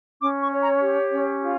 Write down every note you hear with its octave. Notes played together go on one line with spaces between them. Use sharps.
C#4 D6
C#6
C#5
A#5
G4
C#4
F4